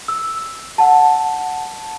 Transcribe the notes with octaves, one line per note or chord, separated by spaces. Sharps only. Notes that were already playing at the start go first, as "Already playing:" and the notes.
E6
F#5 A5